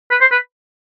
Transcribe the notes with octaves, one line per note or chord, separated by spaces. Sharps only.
B4
C5
B4